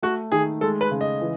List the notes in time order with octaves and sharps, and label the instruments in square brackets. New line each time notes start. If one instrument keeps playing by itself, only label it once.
[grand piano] A3 [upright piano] F#4
[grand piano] D#3 [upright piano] G#4
[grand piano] G#3 [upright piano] A4
[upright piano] B4
[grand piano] C#3
[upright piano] D#5
[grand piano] E3